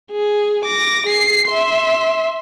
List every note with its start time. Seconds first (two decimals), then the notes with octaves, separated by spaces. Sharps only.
0.12 G#4
0.65 D6 A#6
1.07 G#4 C7
1.49 E5 C6